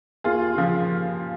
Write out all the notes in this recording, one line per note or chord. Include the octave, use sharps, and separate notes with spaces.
D#2 F4 G#4
C#3 F3